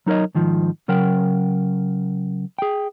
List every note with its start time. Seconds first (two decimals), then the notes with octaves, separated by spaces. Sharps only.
0.06 F#3 D#4 A#4 C#5 D#5
0.35 G#2 D#3 F3
0.88 C#3 F#3 A#4 F#5 G5
2.59 G#4 G5